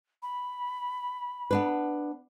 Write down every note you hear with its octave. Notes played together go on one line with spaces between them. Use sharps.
B5
B3 D4 B4